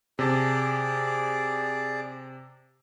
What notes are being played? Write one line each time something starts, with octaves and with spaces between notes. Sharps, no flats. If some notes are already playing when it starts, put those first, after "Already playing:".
C3 G#4 D5 A5